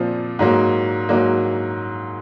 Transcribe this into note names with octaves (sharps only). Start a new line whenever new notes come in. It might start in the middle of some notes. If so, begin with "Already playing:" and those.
Already playing: A#2 F3 C4
G#2 F#3 A#3
G#2 F#3 A#3